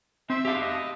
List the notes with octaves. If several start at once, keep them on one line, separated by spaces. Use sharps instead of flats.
C4 E5
G4 F5
D#5